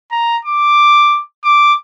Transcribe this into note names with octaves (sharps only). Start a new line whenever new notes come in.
A#5
D6
D6